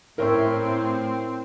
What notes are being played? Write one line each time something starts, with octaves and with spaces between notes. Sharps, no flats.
A2 C4 E4 A#4 C#5 E5